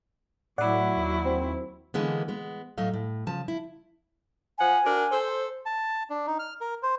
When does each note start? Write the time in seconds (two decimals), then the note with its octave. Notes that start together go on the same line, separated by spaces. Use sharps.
0.58 A2 F#3 E4 D5 F#5
0.96 D#2
1.25 C4
1.94 D3 E3 G#3 A#3 B3
2.28 G#3 B3
2.78 A2 F#3 A3 D#5 F5
2.93 A2
3.27 C#3 F3 A5
3.48 E4
4.58 F3 F#5 G#5
4.84 D4 F#4 A#4
5.11 A4 C5
5.66 A5
6.10 D4
6.27 D#4
6.39 F6
6.61 A#4
6.83 C5